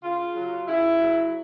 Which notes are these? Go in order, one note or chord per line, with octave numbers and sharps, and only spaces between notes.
C#3 F4
F#3
C#3 E4
F#3